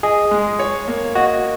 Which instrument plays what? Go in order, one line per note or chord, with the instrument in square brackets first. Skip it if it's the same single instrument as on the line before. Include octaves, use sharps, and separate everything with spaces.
[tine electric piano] G#4 [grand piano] D#5
[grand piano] G#3
C#5
A#3
[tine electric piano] F#4 [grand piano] D#5